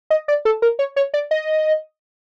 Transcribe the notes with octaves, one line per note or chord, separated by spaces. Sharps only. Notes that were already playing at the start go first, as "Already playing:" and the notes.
D#5
D5
A4
A#4
C#5
C#5
D5
D#5